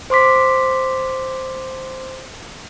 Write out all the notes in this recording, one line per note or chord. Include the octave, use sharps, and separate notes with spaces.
C5 C6 D6 B6